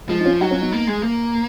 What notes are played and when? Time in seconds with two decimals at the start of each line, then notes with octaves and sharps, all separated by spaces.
0.09 F3 G#3
0.20 D#4
0.25 C#4 F4
0.41 F#3 D#4 F#4
0.50 C#4 F4
0.61 B3 D#4
0.72 A#3
0.87 G#3
1.03 A#3